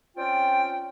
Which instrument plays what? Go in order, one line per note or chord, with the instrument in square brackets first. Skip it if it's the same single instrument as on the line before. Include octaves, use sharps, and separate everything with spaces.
[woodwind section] C4 C#4 F4 D5 G5